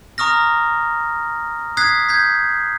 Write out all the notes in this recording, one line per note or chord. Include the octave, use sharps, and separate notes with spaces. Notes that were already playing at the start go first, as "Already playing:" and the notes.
A#5 C#6 D#6 F6 A#6
D#6 F#6 G#6 B6 C7
G6 G#6 B6